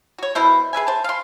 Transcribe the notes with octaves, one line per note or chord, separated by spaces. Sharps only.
F#4 C#5
B2 E4 C5
G#4 B4 E5 G#5
C5 A5
F5 C6